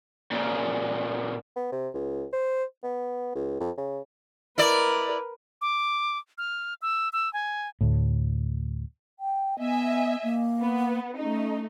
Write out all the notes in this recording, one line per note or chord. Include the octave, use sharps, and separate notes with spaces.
A#2 C#3
B3
C3
C#2
C5
B3
C#2
F2
C#3
E4 A#4 B4 D5
D6
F6
E6
E6
G#5
D2 A2
G5
B3 D#5 E5 G#5
A#3
B3
A3 C#4 D#4